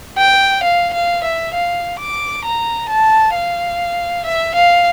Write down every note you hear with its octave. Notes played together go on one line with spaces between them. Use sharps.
G5
F5
F5
E5
F5
D6
A#5
A5
F5
E5
F5